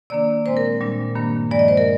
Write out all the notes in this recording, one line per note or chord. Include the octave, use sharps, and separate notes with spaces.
C3 D#3 A#3 D4 D5
A#2 G#3 C4 C5
A#4
A#2 G3 D4
G2 D#3 A#3 D4
G2 F3 G#3 D5
D#5
C5
A#4